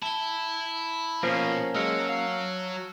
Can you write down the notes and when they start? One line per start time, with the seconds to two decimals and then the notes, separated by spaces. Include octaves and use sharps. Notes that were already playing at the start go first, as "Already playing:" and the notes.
0.02 E4 A5 G7
1.23 B2 F3 A#3 C#4
1.75 F#3 G#3 E6 F6 C#7
2.09 F5